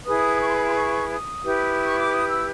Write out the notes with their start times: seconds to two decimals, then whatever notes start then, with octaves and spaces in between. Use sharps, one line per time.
0.06 E4 G#4 B4 D#6
0.41 C#6
0.48 C6
0.57 B5
0.66 C6
0.75 C#6
1.09 D#6
1.42 E4 G4 B4
1.85 C#6
1.98 D6
2.12 D#6
2.29 E6